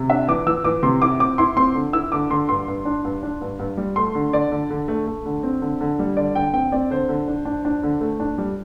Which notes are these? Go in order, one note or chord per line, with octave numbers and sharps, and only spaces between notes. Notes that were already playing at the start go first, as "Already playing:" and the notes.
Already playing: C3
D4 E5
E3 D6
E3 E6
E3 D6
C3 C6
E4 D6
C4 D6
E4 C6
C4 C6
D3
E4 E6
D3 D6
D3 C6
G2 C6
G2
D4
G2
D4
G2
G2
G3
A3 C6
D3
D3 D5
D3
D3
A3
A3
D3
C4
D3
D3
G3
D3 D5
D3 G5
C4 G5
C4 D5
D3 C5
D3
D4
D4
D4
D3
A3
D4
G3